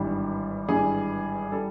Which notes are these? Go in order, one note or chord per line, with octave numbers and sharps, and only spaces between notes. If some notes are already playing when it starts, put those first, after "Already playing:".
Already playing: G#1 G2 E3 G3
G#1 G2 E3 G3 G#4
E3 G3 A4